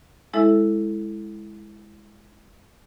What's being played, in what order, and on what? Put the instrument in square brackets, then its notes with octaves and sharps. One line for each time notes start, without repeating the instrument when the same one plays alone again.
[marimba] G#3 E4 A4 E5